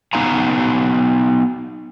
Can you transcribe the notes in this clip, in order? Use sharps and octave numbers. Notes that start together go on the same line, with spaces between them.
B3 D#4 F5 G#5 A#5